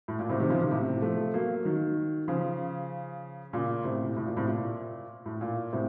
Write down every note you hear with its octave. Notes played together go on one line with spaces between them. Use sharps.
A2
A#2
A2 C3
C3 D#3
C#3 F3
C3 D#3
A2 C3
F3 A3
F#3 A#3
D#3 F#3
C#3 F3
A#2 C#3
A2 C3
A2
A#2
A2 C3
A#2
A2
A#2
A2 C3